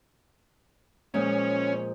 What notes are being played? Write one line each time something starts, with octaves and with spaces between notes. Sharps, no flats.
A#2 F3 G#3 C#4